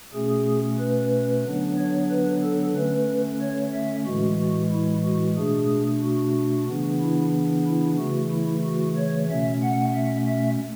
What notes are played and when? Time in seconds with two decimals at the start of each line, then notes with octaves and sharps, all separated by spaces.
0.13 B2 A3 C#4 G#4
0.78 B4
1.45 D3 F#3 B3 D4
1.77 C#5
2.10 B4
2.43 A4
2.75 D3 A3 C#4 B4
3.41 C#5
3.73 E5
4.06 A2 E3 G#3 F#4
4.38 F#4
4.72 E4
5.04 F#4
5.37 B2 A3 D4 G#4
6.03 F#4
6.68 C#3 E3 B3 D4
7.00 E4
7.66 E4
7.98 C#3 E3 A3 F#4
8.31 E4
8.64 F#4
8.97 C#5
9.30 B2 A3 C#4 E5
9.62 F#5
9.94 E5
10.27 E5